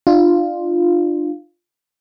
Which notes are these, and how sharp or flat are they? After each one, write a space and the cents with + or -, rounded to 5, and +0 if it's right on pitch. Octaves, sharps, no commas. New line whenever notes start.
D4 +40 F4 +0